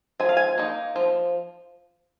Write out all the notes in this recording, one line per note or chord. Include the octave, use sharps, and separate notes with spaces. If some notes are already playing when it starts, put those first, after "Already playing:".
F3 G#5
F5
G#5
A#3 D#4
F3